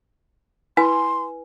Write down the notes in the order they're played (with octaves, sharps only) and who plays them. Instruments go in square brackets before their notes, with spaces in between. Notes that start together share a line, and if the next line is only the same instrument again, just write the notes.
[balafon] E4 [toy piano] B4 G#5 [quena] C6